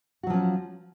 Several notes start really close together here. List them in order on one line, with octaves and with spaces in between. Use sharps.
F#4 F#3 F3 C#4